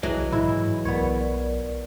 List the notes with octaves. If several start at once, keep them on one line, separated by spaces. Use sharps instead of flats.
B1 E3 F#3 G#3
G#2 E4
B1 B3 A#4 C#5 D5